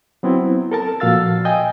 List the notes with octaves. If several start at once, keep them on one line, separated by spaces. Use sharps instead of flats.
F#3 B3 C4 E4
A4 A#4 A5
A#2 F3 F#4 F5 E6 A6
D#5 G5 G#5